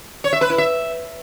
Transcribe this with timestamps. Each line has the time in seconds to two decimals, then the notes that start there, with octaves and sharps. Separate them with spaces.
0.24 C#5
0.33 E5
0.41 B4
0.50 E4
0.58 E5